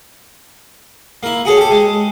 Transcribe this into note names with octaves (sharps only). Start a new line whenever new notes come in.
A#3 E4
F#4 G#4 A4 C#5
G4 A4
G#3